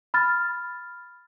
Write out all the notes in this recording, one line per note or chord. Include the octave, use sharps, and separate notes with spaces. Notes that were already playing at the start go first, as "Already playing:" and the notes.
B5 F6 A6